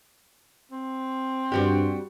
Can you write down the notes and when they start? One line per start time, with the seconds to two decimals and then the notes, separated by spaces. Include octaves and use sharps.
0.72 C4
1.52 G2 G3 F#4 G4